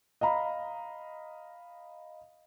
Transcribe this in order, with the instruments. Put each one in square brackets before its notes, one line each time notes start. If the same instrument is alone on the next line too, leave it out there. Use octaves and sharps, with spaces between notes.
[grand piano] D#5 F5 A#5 B5